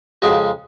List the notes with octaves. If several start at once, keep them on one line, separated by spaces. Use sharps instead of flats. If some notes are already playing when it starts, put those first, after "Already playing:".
F2 C#3 G#3 C#4 F#4